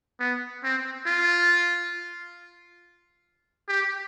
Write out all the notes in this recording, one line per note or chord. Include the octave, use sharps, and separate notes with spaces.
B3
C4
F4
G4